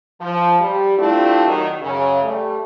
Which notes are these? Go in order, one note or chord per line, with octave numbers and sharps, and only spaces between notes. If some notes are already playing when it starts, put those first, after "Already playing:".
F3
G3
G3 A3 C4 D4 E4 F4
D#3 F#3
F#2 C#3
G3 A3